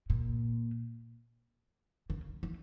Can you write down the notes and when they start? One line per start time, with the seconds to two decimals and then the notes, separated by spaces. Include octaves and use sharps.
0.10 A#2
2.10 C#3
2.43 E3